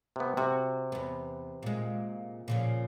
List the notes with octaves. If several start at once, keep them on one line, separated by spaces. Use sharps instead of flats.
C3 B3
C3 F#4
E2 B3
A#2 G#3
A#2 C#3 F3